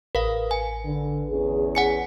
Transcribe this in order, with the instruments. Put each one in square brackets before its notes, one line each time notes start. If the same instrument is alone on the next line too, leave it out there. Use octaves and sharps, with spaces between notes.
[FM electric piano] A1 B4 [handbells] A#4 F5
[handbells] G#5
[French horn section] D3
E2 C#4 G#4
[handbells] F#5 G#5 C#7